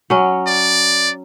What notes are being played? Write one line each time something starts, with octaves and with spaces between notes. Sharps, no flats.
F#3 C#4
D5